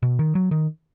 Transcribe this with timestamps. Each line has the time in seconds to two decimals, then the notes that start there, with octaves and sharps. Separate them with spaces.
0.03 B2
0.19 D#3
0.35 F#3
0.51 D#3